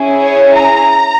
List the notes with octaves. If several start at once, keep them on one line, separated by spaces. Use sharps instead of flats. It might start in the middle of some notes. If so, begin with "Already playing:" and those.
Already playing: C#4 E4 G#4
C#5
A#5